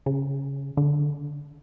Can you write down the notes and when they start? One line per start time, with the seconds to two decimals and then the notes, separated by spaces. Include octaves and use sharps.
0.06 C#3
0.77 D3